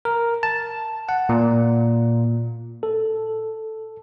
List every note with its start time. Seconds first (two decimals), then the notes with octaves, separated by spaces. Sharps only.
0.05 A#4
0.43 A5
1.09 F#5
1.29 A#2
2.83 A4